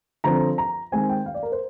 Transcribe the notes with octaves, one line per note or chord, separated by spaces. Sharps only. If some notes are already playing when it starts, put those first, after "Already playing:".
D3 F3 C4 A#5
A#5
D#3 G#3 C4 G#5
G5
F5
D5
A#4
C5